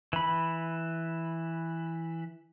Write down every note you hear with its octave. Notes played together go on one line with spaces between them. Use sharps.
E3 B5